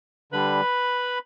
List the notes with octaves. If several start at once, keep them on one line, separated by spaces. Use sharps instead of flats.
D3 G3 B4 B5